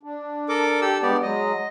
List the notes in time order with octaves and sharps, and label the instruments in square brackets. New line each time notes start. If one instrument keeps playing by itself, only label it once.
[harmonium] D4
[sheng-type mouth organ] A4 A#4 D6
G4 A4 E6
[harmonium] G3 G#3 D4 [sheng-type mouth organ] B3 G4 D5
[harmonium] F#3 G#3 [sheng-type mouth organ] D#5